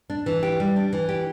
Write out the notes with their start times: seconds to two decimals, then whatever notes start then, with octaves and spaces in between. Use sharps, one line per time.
0.10 D4
0.26 E3
0.43 G4
0.60 G3
0.76 D4
0.93 E3
1.09 G4